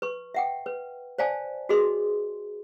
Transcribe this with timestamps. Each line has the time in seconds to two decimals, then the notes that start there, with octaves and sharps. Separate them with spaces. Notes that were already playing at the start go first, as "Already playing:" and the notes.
0.02 B4 C#6
0.34 E5 F#5 G5
0.66 B4
1.18 C5 D5 F5 G#5 A5
1.69 F#4 G#4 B4 D#5 C6